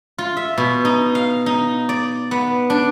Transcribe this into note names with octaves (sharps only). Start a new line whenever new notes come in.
F4
E5
B2
D#4
F5
D#4
D5
B3
D4